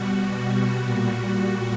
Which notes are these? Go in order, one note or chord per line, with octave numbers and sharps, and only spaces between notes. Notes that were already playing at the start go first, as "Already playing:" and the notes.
Already playing: B2 G3 F#4
A#2 G3